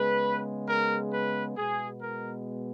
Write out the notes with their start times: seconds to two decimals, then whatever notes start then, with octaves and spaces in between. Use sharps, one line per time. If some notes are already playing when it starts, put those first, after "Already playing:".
Already playing: C#3 G#3 B3 B4
0.68 A#4
1.13 B4
1.57 B2 G#3 B3 G#4
2.02 A#4